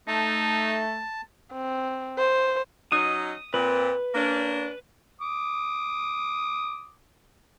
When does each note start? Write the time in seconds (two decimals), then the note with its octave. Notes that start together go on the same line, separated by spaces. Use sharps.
0.08 A3 D#4 A5
1.52 C4
2.18 C5
2.92 F#3 C#4 D#4 D#6
3.54 A#2 C4 B4
4.15 A#3 C#4 D4
5.21 D6 D#6